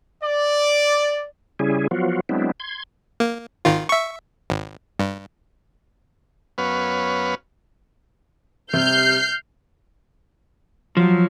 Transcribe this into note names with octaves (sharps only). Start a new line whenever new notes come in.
D5
C#3 G3 C#4 E4 G#4
F3 F#3 B3 F4 F#4
F#3 G#3 B3 C4 D4 E4
C6 G#6
A#3
G#1 D#3 F4
E5 C#6
G#1
G2
F#2 B3 B4 C#5 F5
C3 G3 F6 G6 C7
F3 F#3